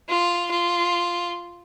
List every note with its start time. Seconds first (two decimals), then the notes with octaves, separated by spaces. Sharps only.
0.09 F4
0.51 F4